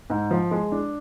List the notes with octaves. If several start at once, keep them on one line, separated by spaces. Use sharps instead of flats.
G#2
F3
G#3
D4